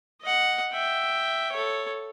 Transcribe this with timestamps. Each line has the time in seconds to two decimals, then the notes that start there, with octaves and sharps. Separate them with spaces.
0.22 D#5 F#5
0.72 E5 G5
1.52 A4 C#5